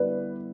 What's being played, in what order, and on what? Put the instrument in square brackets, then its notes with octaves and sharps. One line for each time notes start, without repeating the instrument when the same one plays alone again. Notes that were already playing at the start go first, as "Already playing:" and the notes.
Already playing: [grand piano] D3 G3 B3 E4 [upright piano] B4 D5